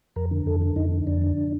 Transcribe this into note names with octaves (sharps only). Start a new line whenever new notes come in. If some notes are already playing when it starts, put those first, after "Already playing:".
F2 A#4
D3
F2 A4
D3
F2 D#4
D3
F2 D4
D3